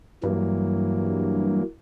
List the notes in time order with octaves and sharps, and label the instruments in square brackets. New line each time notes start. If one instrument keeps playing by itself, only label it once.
[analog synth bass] G2 [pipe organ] E3 F#3 A#3